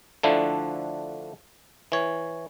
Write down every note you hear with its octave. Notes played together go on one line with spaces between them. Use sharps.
D3 F3 A3 D4 E4
E3 C#5